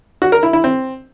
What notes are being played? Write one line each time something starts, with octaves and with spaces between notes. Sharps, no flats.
F#4
A#4
E4
E4
C4